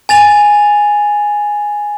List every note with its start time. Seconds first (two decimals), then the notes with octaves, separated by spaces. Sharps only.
0.09 G#5 A6 F7